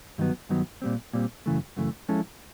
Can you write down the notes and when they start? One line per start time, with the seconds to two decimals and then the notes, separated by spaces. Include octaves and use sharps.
0.18 G2 D#3 F#3 B3
0.49 G2 D#3 F#3 B3
0.82 A#2 G3 C4
1.13 A#2 G3 C4
1.46 F#2 C#3 E3 A3
1.77 F#2 C#3 E3 A3
2.09 F3 G#3 C#4 E4 A4